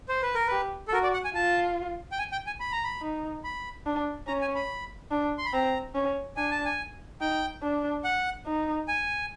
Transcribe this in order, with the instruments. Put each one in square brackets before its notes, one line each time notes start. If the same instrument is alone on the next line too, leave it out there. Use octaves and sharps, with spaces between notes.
[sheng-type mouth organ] C5
B4
A#4
[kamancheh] G4 [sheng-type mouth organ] B4
[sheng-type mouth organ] A4
[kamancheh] F#4 [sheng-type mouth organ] A#4
[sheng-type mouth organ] D5
F#5
G#5
[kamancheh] F4 [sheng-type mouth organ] A5
[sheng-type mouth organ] G5
G#5
G5
G#5
B5
A#5
B5
[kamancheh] D#4
[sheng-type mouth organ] B5
[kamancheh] D4
[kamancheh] C#4 [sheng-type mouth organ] A#5
[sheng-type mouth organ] G#5
B5
[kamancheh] D4
[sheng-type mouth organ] C6
B5
[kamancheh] C4 [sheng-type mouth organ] A#5
[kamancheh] C#4
[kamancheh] D4 [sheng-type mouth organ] G#5
[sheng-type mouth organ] A5
G#5
[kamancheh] D#4 [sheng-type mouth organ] G5
[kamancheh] D4
[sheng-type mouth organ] F#5
[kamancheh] D#4
[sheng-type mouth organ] G#5